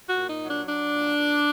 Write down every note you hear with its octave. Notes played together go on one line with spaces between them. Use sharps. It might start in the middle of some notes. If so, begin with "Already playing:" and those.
F#4
A#2
D#4
F#3
D4
F#3 D4
A#2
A#2